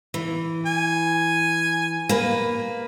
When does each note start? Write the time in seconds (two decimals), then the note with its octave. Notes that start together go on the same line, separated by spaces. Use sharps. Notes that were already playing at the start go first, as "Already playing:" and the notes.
0.14 E3
0.66 G#5
2.09 A#3 B4